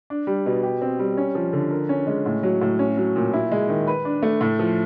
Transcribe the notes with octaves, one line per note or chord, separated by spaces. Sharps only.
D4
G3
B2
G4
C4
G3
C#4
F3
D3
A#4
C#4
G#3
A2
F#3
A2
C#4
F#3
A#2
E4
G#3
D#3
B4
D4
A3
A2
F3